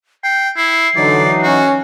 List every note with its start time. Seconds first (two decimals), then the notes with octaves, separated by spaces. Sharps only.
0.24 G5 C7
0.57 E4 C7
0.96 D3 E3 F#3 D#4 D5
1.43 C#4 F#4